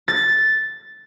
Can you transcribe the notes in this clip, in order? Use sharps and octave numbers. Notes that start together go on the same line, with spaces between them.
A6